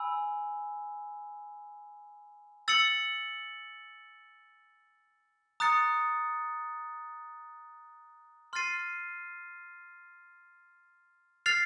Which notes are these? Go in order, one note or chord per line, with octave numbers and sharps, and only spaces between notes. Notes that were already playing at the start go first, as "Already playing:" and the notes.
Already playing: G#5 B5 E6
E6 A6 C#7 F#7
A#5 D#6 F#6 A6 C#7
C6 F6 A6 C7 D#7
F6 A6 C7 F7